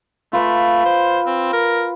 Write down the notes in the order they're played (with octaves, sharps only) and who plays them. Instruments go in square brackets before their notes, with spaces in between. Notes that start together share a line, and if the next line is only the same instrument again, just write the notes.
[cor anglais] A3 [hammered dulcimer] F4 B4
[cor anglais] C5
C4
A#4